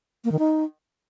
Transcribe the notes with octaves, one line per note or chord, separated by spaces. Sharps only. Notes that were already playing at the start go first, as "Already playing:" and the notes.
A#3
D#3
D#4